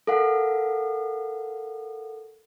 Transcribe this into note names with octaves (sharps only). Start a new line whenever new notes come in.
A4 A#4 F5 F#5